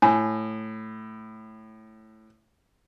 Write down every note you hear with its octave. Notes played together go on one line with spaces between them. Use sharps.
A2 G#5